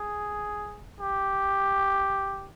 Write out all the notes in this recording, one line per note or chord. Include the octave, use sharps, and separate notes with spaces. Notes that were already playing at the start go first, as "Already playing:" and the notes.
Already playing: G#4
G4